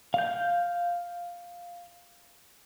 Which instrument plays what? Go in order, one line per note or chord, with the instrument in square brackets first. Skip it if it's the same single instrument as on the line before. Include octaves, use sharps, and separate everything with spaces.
[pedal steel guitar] F5 G6